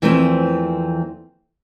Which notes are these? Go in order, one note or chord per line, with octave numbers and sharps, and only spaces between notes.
E2 E3 F3 A3 A#3 C4